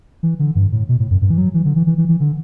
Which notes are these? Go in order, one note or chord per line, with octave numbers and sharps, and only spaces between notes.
E3
D3
G2
A2
B2
A2
F#2
G2
E3
F#3
E3
D3
E3
E3
E3
E3
D3